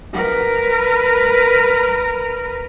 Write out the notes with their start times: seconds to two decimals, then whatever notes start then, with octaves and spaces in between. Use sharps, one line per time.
0.13 A#4 B4